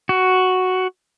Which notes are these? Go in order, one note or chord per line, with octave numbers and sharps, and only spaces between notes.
F#4